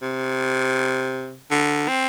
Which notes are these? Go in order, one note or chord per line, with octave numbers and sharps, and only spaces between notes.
C3
D3
C4